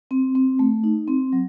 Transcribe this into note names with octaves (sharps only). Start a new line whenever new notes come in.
C4
C4
A3
D#4
C4
F#3